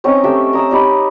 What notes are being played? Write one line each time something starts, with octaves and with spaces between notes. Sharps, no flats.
C4 C#4 D#4 A#5
A3 G4 E5 G5
A#4 D#6 E6
D#4 G4 B5